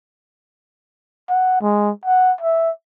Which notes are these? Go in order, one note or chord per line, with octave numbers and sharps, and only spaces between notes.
F#5
G#3
F#5
E5